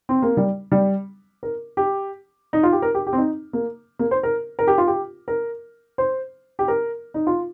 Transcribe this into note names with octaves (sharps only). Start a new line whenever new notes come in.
C4
A#3
G3
G3
A#4
G4
D#4
F4
G4
A#4
G4
G4
C4
D#4
A#3
A#3
C5
A#4
A#4
G4
F4
G4
A#4
C5
G4
A#4
D#4
F4